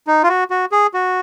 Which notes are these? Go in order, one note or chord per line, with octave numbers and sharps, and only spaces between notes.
D#4
F4
F#4
F#4
G#4
F#4